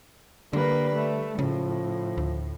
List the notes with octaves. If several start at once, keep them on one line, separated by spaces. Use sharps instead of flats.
D3 G3 A#3 B4
A3
A2 C#3 F3
D2